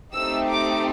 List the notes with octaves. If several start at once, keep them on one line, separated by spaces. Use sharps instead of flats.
A3 C4 D#4 G4 E6
D6